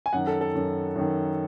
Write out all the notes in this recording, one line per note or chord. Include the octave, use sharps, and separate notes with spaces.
G#5
F#2 D#3 F#5
A4
A4
F#2 D#3
F#2 D#3